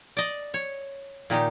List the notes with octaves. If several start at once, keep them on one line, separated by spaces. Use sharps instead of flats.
D5 D#5
C#5
A#2 D#3 D#4 G4